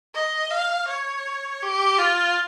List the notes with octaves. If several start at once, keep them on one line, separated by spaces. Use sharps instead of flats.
D#5
F5
C#5
G4
F4